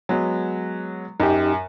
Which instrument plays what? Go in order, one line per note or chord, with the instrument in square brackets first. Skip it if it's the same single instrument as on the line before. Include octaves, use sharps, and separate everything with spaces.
[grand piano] F#3 G#3 B3
[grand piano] F#2 [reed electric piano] D#4 G4